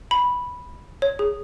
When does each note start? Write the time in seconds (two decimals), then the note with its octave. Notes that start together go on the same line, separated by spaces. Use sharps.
0.11 B5
1.02 C#5
1.19 G#4